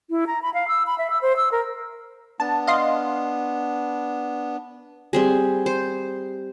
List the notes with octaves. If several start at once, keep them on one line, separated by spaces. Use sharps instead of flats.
E4
A#5
B5
F5
E6
B5
E5
E6
C5
E6
A#4
B3 D4 A5
D#5 F5 C6
G3 C4 G#4
C5